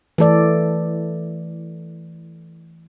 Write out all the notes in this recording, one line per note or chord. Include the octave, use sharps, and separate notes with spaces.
E3 A3 A4 D5